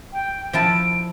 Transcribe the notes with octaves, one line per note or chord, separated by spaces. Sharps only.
G5
F3 E4 A5 D7